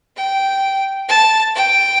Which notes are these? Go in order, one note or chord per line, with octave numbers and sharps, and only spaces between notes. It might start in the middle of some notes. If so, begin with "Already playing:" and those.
G5
A5
G5